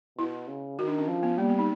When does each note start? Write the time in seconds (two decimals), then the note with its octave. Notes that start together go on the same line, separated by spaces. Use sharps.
0.18 B2 E4
0.48 C#3
0.79 D#3 F#4
0.88 D4
0.98 C#4
1.08 F3
1.23 B3
1.38 G3 A#3
1.49 B3
1.59 D#4